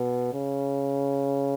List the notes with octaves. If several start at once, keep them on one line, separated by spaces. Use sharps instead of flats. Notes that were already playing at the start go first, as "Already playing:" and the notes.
Already playing: B2
C#3